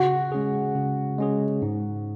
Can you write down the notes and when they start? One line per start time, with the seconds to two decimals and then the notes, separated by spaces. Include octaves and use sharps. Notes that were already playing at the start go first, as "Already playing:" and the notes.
Already playing: C#3 F#4
0.32 G#3 C#4 G#4
0.75 C#3
1.19 G#3 C#4 G#4
1.62 G#2